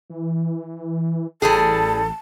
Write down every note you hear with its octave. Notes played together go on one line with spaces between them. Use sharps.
E3
A1 E3 G3 G#4 A4 A5